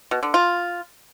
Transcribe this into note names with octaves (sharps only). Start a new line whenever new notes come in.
B2
D3
F4